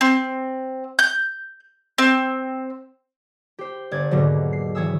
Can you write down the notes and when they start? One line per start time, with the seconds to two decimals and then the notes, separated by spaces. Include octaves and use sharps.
0.01 C4
0.99 G6
1.98 C4
3.59 G4 C5
3.91 G1 D5 G#6
4.11 D#2 G#2 B2 D3 F#3
4.53 C7
4.75 G#1 E3 C#5 G#5 D#6 E6